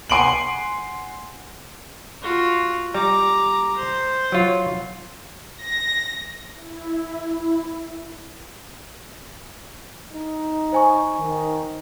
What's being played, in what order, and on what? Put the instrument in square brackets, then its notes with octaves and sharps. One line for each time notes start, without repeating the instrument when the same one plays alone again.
[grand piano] F#5 G#5 C6 D7 D#7 F#7
[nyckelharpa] F4 F#4
[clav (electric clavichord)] G3 [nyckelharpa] A#5 D6
[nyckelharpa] C5
[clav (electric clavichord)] F#3 F4
[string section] A#6
[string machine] E4
[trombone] D#4
[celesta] C5 G#5 C#6
[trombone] D#3